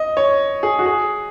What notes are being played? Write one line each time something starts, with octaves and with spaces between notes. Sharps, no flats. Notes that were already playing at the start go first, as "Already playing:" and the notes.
Already playing: D#5
C#5
G#4
F#4
G#4